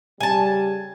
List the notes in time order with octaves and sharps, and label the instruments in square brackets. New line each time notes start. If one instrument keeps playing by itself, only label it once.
[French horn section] C#3 G3 [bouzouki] G#5 A5